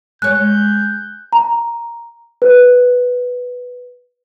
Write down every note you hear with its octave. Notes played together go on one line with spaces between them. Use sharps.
G#3 C#5 F#6 G6
A#5
B4